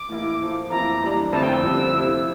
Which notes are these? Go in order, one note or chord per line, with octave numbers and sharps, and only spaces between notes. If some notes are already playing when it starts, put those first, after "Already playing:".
Already playing: D6
A2 E3 A#3 E4
A2 F3 A3
F2 E3 A#3 E4 A#5
E3 G3 D4
F2 D3 A3 C4 E4 A5
G5
E6
F2 D3 G3 C4
C3 F3 C4 E4